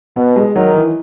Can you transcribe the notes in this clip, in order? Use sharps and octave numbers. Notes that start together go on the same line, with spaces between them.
B2 B3
G#3
D#3 F#3
E3